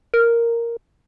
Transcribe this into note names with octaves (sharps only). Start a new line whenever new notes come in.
A#4